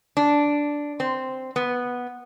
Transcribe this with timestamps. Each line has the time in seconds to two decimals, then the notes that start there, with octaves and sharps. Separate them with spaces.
0.17 D4
1.00 C4
1.56 B3